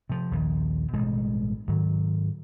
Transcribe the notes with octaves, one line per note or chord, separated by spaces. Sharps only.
C3 F3
A#1 D#2
A1 G2 B2 G#3
G#2 D#3 F#3